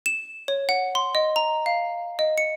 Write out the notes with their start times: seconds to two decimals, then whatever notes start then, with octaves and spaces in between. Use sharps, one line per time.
0.06 E7
0.48 C#5
0.69 F#5
0.95 C6
1.15 D#5
1.36 A#5
1.66 F5
2.19 D#5
2.38 C#7